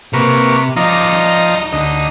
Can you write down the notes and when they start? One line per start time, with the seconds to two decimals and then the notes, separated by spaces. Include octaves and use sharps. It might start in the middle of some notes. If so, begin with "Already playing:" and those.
0.14 C3 A#3 B4 C#6
0.76 F3 D#4 D5 D#5 A#5
1.73 D2 D#5